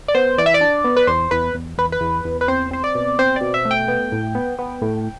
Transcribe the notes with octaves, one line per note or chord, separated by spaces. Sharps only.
D5
B3 C5
E3 D5
E5
D5
D4
B3
B4
E2 C5
E2 B4
E2
E2 B4
B4
E2
E2
B4
C4 C5
C4 C5
D5
B2
C4 C5
B2 D5
E5
A3
G5
B3
A2
B3
B3
A2